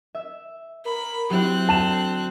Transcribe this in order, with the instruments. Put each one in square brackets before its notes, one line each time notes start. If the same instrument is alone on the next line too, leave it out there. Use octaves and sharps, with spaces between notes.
[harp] E5
[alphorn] A#4 [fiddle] B5
[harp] F#3 E4 [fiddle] C4 F#6 [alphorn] G4
[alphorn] D3 [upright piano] A5 E7